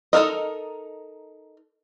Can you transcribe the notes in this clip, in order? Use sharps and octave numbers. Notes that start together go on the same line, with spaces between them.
D#4 A4 A#4 D#5